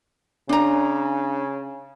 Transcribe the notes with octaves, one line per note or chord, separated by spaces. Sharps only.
C#3 D4 A#5